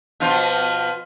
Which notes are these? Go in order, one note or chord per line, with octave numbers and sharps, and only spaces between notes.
B2 F3 F4